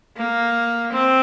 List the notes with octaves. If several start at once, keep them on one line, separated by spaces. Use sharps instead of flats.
A#3
C4